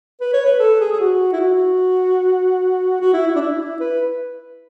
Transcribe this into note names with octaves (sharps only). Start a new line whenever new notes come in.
B4
C#5
B4
A4
G#4
G#4
F#4
E4
F#4
F#4
E4
E4
D4
E4
E4
B4